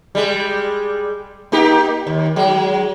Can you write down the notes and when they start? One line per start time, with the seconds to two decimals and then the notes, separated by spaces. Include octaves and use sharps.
0.15 G3 G#3
1.52 A#3 D#4 G4
2.07 D#2
2.36 F#3 G#3